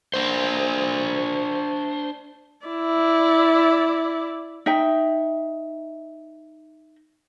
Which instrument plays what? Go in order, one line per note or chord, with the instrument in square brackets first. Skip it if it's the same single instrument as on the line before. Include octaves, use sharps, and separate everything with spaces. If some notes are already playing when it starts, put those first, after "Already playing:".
[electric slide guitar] D4 C5
[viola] E4 D5
[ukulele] D#4 E5 G5